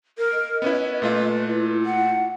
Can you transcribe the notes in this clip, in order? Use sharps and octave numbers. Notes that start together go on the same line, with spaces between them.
A#4
D#5
B3 C#4 E4 B4
A#2 A3 F4
E4
F#5